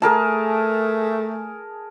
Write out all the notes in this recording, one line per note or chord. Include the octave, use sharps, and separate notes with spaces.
A3 G#4 A#4 A5